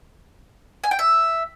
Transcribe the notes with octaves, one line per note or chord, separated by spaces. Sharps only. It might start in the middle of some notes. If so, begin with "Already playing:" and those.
G#5
G5
E5